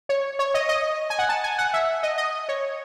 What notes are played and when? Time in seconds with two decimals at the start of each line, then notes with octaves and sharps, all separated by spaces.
0.09 C#5
0.39 C#5
0.54 D#5
0.69 D#5
1.10 G#5
1.19 F#5
1.29 A5
1.44 G#5
1.58 F#5
1.73 E5
2.03 D#5
2.18 D#5
2.49 C#5